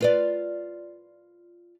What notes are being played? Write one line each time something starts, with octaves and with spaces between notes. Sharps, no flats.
F4 B4 D5